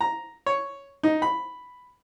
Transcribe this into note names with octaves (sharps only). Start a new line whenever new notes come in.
A#5
C#5
D#4
B5